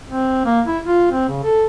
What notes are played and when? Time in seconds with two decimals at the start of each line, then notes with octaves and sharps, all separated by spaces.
0.10 C4
0.45 A#3
0.67 E4
0.86 F4
1.12 C4
1.29 C#3
1.43 A4